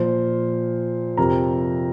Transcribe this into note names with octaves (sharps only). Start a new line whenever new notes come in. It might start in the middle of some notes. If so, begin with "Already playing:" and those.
Already playing: A#2 F3 C5
F2 C3 F3 A#4 A#5